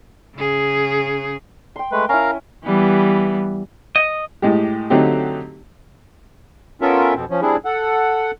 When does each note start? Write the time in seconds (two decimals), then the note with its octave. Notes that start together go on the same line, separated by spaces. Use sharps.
0.36 C#3 G#4
1.76 G5 C6
1.92 G#3 A3 B4
2.09 C#4 E4 A#4 F5 A#5
2.65 E3 G3 B3
3.96 D#5
4.42 A2 G#3 G4
4.90 D3 F#3 A3 C4 D#4 G4
6.81 B3 C#4 F4 A4 A#4 E5
7.15 F2 B2 C4
7.30 F3 C#4
7.42 G3 C4 D4 E4 G#4
7.65 A4 F#5